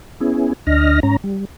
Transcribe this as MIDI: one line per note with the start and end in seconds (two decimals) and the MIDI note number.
0.20 0.53 59
0.20 0.53 61
0.20 0.53 64
0.20 0.53 68
0.67 1.00 38
0.67 1.00 62
0.67 1.00 75
0.67 1.00 89
0.67 1.00 94
1.03 1.16 44
1.03 1.16 61
1.03 1.16 82
1.24 1.45 55